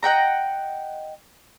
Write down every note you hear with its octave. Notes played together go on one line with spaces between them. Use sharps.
D#5 F#5 G5 A#5